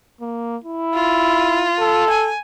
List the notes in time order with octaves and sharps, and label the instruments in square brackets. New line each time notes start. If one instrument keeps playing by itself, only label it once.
[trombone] A#3
E4
[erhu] F4
[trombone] A4
[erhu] G#5